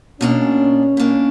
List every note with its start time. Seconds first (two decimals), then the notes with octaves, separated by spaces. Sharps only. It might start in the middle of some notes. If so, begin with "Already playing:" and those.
0.21 B2 A#3 C#4 D4
0.97 B2 A#3 D4